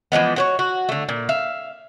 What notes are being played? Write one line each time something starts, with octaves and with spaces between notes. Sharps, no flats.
E3 F3 G#3 B3
F#4 C5 C#5
F#4
D3 A3
A#2
E5 F5